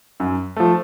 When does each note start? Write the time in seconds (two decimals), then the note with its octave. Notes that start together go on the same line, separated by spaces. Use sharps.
0.20 F#2
0.56 F3 A3